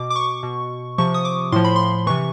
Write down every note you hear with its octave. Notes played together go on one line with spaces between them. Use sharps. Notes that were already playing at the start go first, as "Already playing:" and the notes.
Already playing: B2 D6
D6
C#6
B2
C3 F3 C#6
D#6
D6
A2 F3 C6
B5
C6
C3 E3 C#6